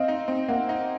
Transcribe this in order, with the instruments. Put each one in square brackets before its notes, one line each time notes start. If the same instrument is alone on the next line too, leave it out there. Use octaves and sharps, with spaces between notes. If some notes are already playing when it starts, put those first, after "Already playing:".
Already playing: [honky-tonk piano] C4 [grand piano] D#5 F5
[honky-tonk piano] D#4
C4
[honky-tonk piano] A#3 [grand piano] E5 F#5
[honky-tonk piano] D#4